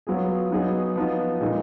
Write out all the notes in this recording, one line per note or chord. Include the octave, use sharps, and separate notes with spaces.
F#3 B3 F4 G#4
F#3 B3 D#4 G#4
F3 B3 D#4
A#2 G#3 D#4